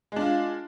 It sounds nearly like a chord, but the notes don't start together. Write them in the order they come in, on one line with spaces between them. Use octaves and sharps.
G#3 D4 F4